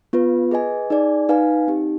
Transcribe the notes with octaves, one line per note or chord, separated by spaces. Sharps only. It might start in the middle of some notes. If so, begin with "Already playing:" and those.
B3 F4 B4
G#4 B4 D#5 G#5
D#4 G#4 D5 G#5
D#4 B4 F5 G#5
C4 D#4 G4